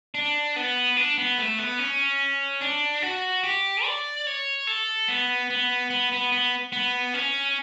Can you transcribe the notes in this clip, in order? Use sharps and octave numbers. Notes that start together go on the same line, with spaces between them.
D4
B3
D4
B3
A3
B3
C#4
D4
F#4
G4
D5
C#5
A4
B3
B3
B3
B3
B3
B3
C#4